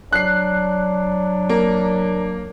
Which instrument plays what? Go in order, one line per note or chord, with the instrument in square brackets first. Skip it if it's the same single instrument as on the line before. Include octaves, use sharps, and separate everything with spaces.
[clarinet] F#3 [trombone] D4 [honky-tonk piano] F#6 C7
[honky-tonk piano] A#3